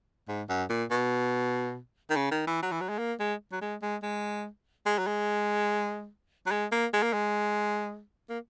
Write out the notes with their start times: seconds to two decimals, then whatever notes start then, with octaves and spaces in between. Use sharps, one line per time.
0.29 G#2
0.49 F#2
0.70 A#2
0.91 B2
2.10 D#3
2.16 C#3
2.32 D#3
2.47 E3
2.63 F#3
2.72 E3
2.81 F#3
2.89 G#3
2.99 A#3
3.20 G#3
3.52 F#3
3.61 G#3
3.82 G#3
4.03 G#3
4.86 G#3
4.98 F#3
5.07 G#3
6.47 F#3
6.52 G#3
6.72 A#3
6.94 G#3
7.03 A#3
7.13 G#3
8.29 A#3